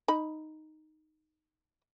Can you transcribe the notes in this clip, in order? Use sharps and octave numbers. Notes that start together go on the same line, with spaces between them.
D#4 B5